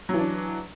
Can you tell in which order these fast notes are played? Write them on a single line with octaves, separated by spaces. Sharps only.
F#3 E3 D4